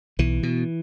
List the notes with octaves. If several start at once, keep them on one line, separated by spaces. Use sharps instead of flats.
B1 E3
B2